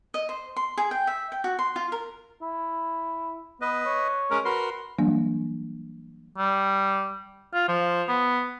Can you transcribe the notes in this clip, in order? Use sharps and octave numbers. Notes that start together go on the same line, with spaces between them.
D#5
C5
C6
G#4
G5
E5
G5
F#4
C6
F4
A#4
E4
B3 B4 D#5
C#5
G#3 C#4 A#4
F#4 A#4 B4 C6
E3 F#3 G3 A#3 D4
G3
F4
F3
B3